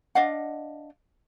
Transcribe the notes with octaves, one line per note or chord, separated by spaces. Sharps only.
D4 D#5 F5 F#5